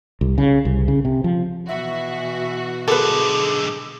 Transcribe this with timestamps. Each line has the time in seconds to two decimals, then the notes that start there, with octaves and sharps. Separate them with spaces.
0.21 C2
0.38 C#3
0.65 C2
0.88 C#3
1.05 C3
1.24 F3
1.68 B2 E3 F#4 E5
2.88 B1 D3 G#4 A4 B4